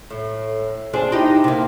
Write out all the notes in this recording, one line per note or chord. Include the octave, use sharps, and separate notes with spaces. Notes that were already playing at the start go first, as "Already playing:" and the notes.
A2
C4 D4 G#4
D#4 E4 G4
C3 A#3